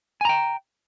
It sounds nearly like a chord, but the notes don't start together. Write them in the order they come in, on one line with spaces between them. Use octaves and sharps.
G#5 A#5 G5